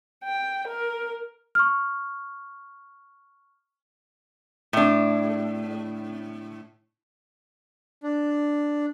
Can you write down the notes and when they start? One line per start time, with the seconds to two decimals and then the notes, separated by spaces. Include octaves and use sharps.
0.25 G5
0.67 A#4
1.55 C#6 F6
4.73 A2 D4
8.03 D4